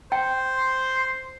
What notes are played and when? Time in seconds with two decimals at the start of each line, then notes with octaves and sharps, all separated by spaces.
0.12 C5 G5
0.57 C6